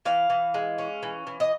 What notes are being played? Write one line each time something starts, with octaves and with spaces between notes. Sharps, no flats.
E3 F5
E3
G#3
C#4
E3
E3
D#5